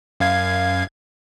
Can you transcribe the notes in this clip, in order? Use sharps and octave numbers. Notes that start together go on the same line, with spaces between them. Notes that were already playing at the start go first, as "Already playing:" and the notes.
F#2 F5 G#6